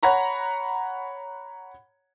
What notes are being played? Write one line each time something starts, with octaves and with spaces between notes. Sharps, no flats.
C#5 F#5 A#5 B5